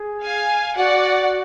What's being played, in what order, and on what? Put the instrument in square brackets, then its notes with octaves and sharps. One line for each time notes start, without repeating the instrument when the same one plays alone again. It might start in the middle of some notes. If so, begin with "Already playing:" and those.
Already playing: [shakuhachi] G#4
[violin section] F5 G#5
[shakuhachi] F#4 [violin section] D5 F#5